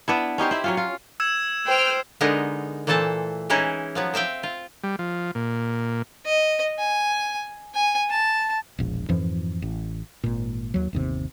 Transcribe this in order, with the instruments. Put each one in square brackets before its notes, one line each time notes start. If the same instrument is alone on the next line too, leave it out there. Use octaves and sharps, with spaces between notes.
[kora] B3 D4 E4
C#4 D#4 G4 C5
C4 E4
F#3 C#4 F4
F4
[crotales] E6 G#6 E7
[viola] C5 [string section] G5 F6
[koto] D3 G#3 B3 D#4 A#4
A#2 E3 A3 A4 C5 A5
E3 G#3 C#4 D#4 E4
F3 F#3 B3
C4 E5 F5 G5
F4
[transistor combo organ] G3
F3
A#2
[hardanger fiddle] D#5
G#5
G#5
A5
[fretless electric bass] E1 A#1
F2 G#2 E3 F3
A1
G#1 A#2
D#2 F#3
G1 D#2 C3